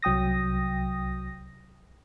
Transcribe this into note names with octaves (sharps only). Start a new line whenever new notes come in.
C2 F#3 G5 D#6 A#6